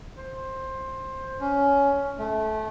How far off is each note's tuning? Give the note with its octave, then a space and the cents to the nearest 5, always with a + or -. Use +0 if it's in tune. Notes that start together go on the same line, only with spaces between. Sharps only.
C5 +15
C#4 +15
A3 -20